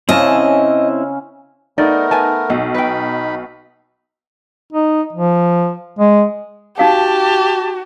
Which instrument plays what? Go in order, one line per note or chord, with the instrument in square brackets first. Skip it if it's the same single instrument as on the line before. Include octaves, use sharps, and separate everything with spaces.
[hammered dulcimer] C#3 C#4 [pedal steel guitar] C4 E4 A5 [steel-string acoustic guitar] D#5
[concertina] A3 B3 A#4 [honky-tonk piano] D#4 [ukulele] D5
[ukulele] B4 G#5 A5
[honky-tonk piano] B1 [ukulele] D#4
[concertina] D#4 B5 [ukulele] B4 G5
[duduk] D#4
F3
G#3
[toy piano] D#4 F5 G5 [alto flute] F#4 [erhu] G4 [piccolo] A5